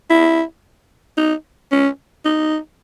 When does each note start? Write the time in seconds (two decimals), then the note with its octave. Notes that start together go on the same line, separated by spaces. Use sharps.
0.10 E4
1.17 D#4
1.72 C#4
2.25 D#4